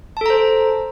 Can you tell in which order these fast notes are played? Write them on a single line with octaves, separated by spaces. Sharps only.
A5 A4 A#5 C5